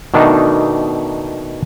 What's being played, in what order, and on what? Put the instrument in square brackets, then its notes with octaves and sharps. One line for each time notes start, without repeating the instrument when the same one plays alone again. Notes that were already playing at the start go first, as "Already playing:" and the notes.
[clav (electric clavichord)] B2 D#3 A3 D4 D#4